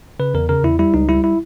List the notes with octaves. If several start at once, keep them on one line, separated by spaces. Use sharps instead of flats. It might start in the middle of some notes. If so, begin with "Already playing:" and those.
C#3 B4
E2 A#4
C#3 A#4
E2 E4
G3 E4
C#2 D#4
G3 E4
E4